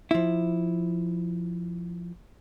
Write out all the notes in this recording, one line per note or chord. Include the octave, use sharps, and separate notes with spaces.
F3 E4